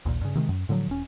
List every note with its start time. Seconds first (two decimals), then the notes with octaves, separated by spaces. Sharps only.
0.05 A#1 D#2 A#2
0.21 G2 C#3
0.35 C3 D#3 G3 G#3
0.49 F#2
0.69 A2 D3 F3 F#3
0.88 E1 C#4